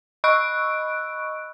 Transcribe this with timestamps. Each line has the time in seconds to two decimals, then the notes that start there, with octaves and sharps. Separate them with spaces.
0.24 D#5 B5 C#6 E6 F#6 D7